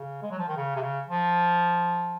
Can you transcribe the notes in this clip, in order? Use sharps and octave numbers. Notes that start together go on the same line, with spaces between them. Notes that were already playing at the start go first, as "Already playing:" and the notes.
Already playing: C#3
G#3
F#3
F3
D#3
C#3
C3
C#3
F3